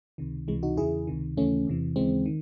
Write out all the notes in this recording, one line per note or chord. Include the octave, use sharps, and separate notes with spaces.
C#2 C3 D#3
C#2 C3 E3 G#3
D#4 F#4
E2 C#3 E3 E4 G#4
C#2 C3 D#3
D#2 C#3 E3 A3 C#4
E2 C3 E3
D#2 C#3 E3 G#3 C4
D#3